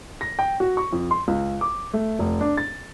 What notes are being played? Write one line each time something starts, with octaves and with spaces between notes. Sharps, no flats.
A#6
G5
F#4
C#6
F2
C6
C#2
D6
A3
F1
D4
A6